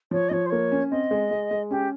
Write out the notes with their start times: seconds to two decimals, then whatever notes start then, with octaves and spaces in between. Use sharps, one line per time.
0.11 F3 C#5
0.29 F3 C#5 D#5
0.46 C5
0.50 A#3 C#5
0.72 C#4
0.91 C4 D#5
1.11 G#3
1.31 G#3
1.51 G#3
1.71 C#4 G4